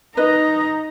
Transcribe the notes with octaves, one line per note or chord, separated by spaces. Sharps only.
D#4 B4 D#5 A#5